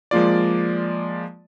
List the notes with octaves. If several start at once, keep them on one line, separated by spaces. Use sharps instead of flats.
F3 G#3 A#3 F4 D5